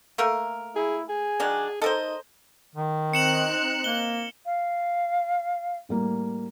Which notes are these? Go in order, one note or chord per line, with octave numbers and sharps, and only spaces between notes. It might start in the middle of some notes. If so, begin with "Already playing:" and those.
A3 A#3 A#4
E4 G#4
G#4 G#5
D#3 F#3 D4
D#4 A4 A#4 C5 D#5
D#3
C4 D#4 F#6 C#7 E7 F#7
A#3 G7
F5
A2 G3 A#3